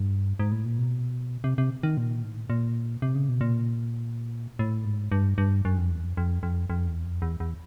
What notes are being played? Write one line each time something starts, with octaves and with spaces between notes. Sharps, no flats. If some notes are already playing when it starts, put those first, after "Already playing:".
Already playing: G2
G#2
A2
A#2
B2
C3
C3
D#3
A#2
A2
A#2
C3
C#3
B2
A#2
A2
G#2
G2
G2
F#2
F2
E2
F2
F2
F2
F2
E2
F2
E2
E2